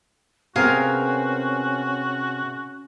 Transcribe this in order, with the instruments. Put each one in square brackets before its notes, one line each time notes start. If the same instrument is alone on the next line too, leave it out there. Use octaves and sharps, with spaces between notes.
[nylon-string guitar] C3 B3 [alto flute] C#4 [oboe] F#4 [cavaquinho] G#4 A#4 F5